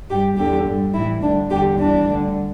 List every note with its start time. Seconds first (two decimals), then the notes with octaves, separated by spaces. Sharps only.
0.09 G2 G3 G4
0.37 E2 D3 G3 G4
0.65 G2 G3
0.93 A2 E3 G3 E4
1.22 D2 D3 G3 D4
1.50 E2 D3 G3 G4
1.78 E2 E3 G3 D4
2.06 D2 D3 G3